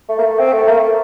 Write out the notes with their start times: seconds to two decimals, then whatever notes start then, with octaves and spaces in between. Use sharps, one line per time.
0.09 A3
0.19 A#3
0.24 A3
0.39 C4
0.53 A3
0.67 A#3
0.78 A3